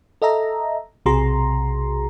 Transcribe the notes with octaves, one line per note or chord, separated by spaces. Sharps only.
A4 D#5 E5 A#5
B1 C3 F#4 G#4 A#5 C6